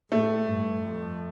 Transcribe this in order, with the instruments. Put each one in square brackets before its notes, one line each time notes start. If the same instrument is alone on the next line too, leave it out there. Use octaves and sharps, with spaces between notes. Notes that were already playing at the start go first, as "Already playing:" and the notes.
[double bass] A2 [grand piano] A3
[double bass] G2
F2